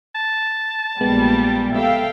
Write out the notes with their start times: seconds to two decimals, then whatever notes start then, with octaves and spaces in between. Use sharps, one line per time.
0.15 A5
1.01 A#1 A#2 G3 G#3 B3
1.75 A4 E5 F5 G5